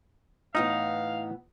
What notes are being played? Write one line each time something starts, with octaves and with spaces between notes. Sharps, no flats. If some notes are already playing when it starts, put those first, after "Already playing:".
A2 E3 B3 D#4 F5